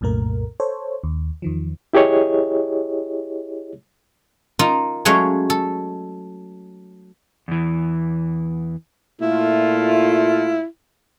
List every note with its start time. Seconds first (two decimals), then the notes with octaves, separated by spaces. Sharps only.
0.01 C2 F#2 A#2 A3 A#4
0.60 A4 C5 C#5
1.04 D#2
1.42 E2 D#3 F3
1.93 E4 G4 G#4 C#5 D#5
4.59 D#4 F4 A#4
5.05 F#3 G#3 A3 C#4 C#5 F5
5.50 A4
7.48 E2 E3
9.21 A#2 A3 E4 F4